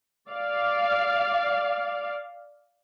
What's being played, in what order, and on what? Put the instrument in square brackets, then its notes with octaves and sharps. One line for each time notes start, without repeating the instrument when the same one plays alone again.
[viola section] D5 F5